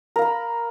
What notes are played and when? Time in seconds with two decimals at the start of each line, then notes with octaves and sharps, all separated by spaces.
0.16 A#4
0.19 F5
0.22 B5